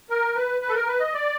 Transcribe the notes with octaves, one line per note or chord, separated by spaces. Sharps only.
A#4
B4
B4
A4
A#4
B4
D#5
D5